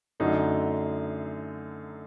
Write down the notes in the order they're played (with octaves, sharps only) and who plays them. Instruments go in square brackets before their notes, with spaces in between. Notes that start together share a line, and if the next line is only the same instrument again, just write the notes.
[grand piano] F#2 D3 A3 D#4 F#4